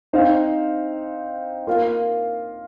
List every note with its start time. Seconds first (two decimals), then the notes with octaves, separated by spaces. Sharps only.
0.13 C4 D#4 C5 F5
1.67 A#3 F4 A#4 F5